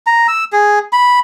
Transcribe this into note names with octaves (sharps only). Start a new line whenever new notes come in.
A#5
E6
G#4
B5